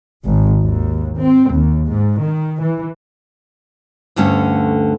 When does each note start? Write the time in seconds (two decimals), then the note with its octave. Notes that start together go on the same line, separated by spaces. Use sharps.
0.25 G#1
0.63 D#2
1.20 C4
1.54 D#2
1.88 G#2
2.24 D#3
2.63 E3
4.16 D2 G2 D3 A3 C#4